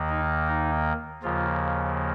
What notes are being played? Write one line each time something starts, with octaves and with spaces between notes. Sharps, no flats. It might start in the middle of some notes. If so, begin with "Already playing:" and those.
Already playing: D#2 D#3 A#3
D#4
D#4
D#2 C#3 F3 A#3 F4